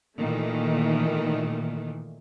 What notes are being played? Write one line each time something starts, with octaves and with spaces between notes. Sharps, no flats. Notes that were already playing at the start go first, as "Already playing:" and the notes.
A#2 D#3 E3 A3